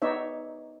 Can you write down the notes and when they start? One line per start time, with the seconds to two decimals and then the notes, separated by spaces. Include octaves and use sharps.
0.02 B3 D#4 C#5 D5 E5